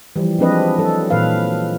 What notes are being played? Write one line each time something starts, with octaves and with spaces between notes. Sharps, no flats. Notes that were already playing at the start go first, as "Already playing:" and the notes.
E3 F3 G3
F3 G#3 C4 D4 B4 D#5
F#3 A4
A#2 E3 B4 F5